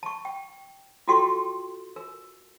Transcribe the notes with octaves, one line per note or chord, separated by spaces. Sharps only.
A5 C#6
G5
F4 F#4 A4 G5 C6 C#6
A#4